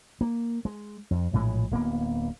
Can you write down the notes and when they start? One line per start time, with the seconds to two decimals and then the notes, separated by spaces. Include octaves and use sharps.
0.21 A#3
0.65 G#3
1.11 F2
1.33 A#1 A2 E3 G#3
1.71 D1 A#3 B3